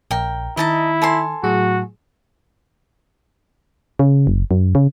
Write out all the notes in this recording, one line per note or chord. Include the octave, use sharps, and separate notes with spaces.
A#1 A#4 G5
D#3 E4 D#5 A5 A#5
A4 G#5 C6
A2 F#3 F#4 G#4
C#3
F#1
F#2
C#3